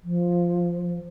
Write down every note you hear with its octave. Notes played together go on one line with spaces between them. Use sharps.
F3